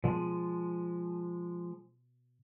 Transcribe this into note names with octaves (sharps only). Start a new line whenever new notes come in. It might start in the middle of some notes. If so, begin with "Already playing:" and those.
B2 F3 G#3